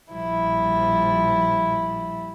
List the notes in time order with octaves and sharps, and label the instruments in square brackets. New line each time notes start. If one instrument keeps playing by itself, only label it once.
[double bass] A#1 F3 [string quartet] G3 E4